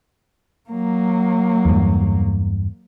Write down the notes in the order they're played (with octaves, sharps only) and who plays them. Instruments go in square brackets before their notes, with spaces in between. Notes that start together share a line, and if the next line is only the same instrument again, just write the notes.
[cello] F#3 A#3
[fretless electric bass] E2 G2